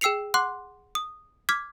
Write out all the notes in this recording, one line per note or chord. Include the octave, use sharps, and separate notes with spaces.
G#4 G5 E6 C7 C#7 F7
F#5 C6 D6 F#6
D#6
D6 F6 G#6 B6